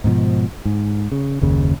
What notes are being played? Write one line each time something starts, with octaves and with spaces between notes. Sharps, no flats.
G#2 B2 D#3 F3
G#2
C#3
F#1 D#2 C#3